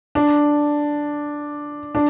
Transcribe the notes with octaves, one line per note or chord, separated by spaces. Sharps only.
D4
D4